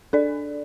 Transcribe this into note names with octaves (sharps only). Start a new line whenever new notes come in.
D4 A4 D5